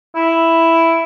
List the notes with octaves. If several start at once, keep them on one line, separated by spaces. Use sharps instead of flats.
E4